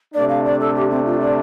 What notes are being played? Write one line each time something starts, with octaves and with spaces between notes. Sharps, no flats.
C3 A3 D4 D5
F5
D5
A4
G4
C4
F4
D5